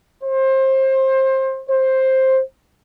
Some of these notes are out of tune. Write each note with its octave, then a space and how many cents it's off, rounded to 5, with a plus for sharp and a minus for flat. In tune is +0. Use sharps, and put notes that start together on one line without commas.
C5 +25
C5 +10